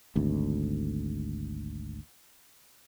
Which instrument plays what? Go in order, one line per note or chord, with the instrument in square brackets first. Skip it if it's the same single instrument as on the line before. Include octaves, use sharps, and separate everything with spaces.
[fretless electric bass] G#1 D2